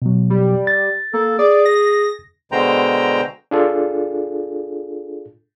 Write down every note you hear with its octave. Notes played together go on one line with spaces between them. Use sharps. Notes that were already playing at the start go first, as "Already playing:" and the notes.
B2 F#3
G3
A6
A#3 A4
G#4 D5
A#6
B2 D3 G#3 C5 G5 A#5
D4 F4 G#4 A4